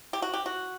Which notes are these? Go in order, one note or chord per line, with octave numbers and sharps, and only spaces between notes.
G4
F#4
G4
F#4